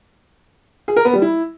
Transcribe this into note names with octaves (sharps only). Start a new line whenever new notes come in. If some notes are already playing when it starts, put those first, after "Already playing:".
G#4
A#4
B3
G3
E4